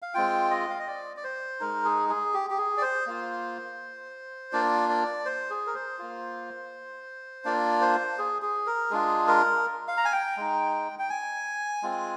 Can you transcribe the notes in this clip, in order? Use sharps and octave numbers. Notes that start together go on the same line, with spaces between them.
F5
G#3 C4 F4 G5
D#5
F5
D#5
D5
D5
C5
G#3 D#4 A#4
G#4
G#4
G4
G4
G#4
D5
C5
A#3 F4
A#3 D4 F4 D5
D5
C5
G#4
A#4
C5
A#3 F4
A#3 D4 F4 D5
C5
G#4
G#4
A#4
G#3 D4 F4 G#4
A#4
F5
A#5
G#5
G5
G#3 D#4
G5
G#5
G#3 C4 F4